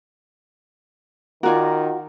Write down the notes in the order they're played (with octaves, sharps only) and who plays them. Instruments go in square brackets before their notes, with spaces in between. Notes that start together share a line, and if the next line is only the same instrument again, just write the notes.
[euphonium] D#3 [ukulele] F4 F#4 [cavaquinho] A#4 D5 G#5